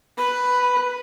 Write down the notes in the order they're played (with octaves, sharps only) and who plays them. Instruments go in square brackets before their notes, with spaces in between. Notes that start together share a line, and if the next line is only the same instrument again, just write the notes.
[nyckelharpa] B4 [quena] B5